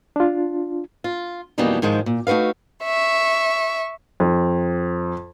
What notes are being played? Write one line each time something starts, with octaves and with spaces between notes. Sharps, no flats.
D4 F4
F4
F2 B2 E3 G3 A#3 D#4
G#2 D#3 F3 G#3
A#2
A3 D#4 F#4 B4 F5
E5 C#6
F2